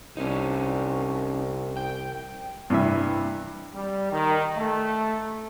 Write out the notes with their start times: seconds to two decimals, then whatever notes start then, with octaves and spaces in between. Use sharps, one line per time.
0.17 C2 C#4 D#4
1.77 G5
2.70 G2 C3 E3 E5
3.74 G3
4.12 D#3
4.57 A3